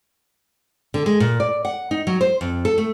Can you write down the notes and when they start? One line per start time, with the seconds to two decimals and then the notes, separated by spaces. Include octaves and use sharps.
0.94 D3
1.06 G#3
1.20 A#2
1.40 D5
1.65 F#5
1.91 D#4
2.07 F#3
2.21 C5
2.41 F2
2.65 A4
2.78 A3